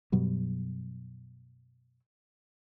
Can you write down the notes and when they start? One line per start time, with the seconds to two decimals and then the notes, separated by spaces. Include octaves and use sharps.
0.12 F#2 B2 F#3 G3